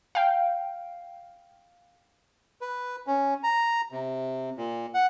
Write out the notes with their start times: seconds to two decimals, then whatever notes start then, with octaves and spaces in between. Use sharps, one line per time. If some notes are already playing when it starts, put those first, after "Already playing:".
0.15 F5 G5
2.61 B4
3.07 C#4
3.43 A#5
3.92 C3
4.57 A#2
4.94 F#5